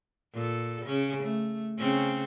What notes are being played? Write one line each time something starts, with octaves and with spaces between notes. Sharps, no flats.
A#2 A4
C#3 C#4
A3
C#3 C4 C#4